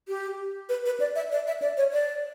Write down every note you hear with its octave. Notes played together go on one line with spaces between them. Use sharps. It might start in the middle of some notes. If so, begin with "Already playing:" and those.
G4
B4
B4
D5
E5
D5
E5
D5
C#5
D5